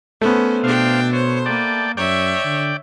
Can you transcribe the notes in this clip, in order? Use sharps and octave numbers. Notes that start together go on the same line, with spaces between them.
A3 B3 C#4 C5
B2 D4 C5 F5 G5
C5 C#5
A#3 D5 G5 A5
F#2 C#5 D5 E5 G5
D3